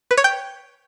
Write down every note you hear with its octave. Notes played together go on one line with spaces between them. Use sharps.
B4
C#5
G5